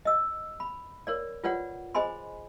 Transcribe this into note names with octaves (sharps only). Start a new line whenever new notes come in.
D#5 E6
B5
A#4 C#5 D5
F4 B4 C#5 D5 F#5
G#4 C5 D#5 G#5 B5 C6